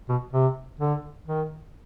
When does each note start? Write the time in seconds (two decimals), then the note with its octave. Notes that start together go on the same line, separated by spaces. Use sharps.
0.09 B2
0.33 C3
0.80 D3
1.27 D#3